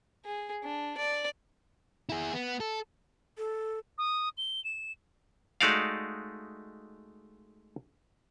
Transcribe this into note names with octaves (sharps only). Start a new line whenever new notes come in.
G#4
D4
D5
E4 G#4
B3
A4
A4
D#6
G7
E7
G#3 A3 D#4 F#4 D5 F5